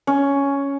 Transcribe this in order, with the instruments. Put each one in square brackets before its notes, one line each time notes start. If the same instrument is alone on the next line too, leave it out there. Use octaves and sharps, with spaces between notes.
[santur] C#4